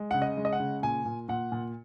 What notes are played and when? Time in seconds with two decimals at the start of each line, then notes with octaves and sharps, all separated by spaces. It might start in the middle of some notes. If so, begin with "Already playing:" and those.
Already playing: G#3
0.11 C#3 F#5
0.22 D#5
0.37 G#3
0.45 D#5
0.53 F#5
0.60 C#3
0.83 A#2 G#5
1.06 A#2
1.29 A#2 F#5
1.52 A#2